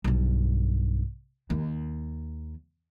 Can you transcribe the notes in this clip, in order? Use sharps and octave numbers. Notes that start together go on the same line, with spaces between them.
B1 G2
D#2